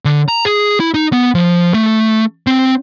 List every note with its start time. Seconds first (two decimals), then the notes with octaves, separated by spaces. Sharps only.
0.05 D3
0.29 A#5
0.45 G#4
0.80 E4
0.94 D#4
1.13 B3
1.35 F3
1.74 A3
2.47 C4